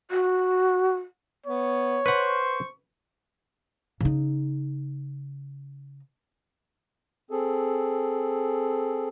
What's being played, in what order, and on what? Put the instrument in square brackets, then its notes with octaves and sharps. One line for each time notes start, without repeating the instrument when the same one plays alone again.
[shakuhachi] F#4
[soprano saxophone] B3 [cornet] C#5
[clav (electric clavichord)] B4 F#5 [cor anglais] C5 [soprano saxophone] C#6
[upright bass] C#3 D#4
[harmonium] C4 G#4 A4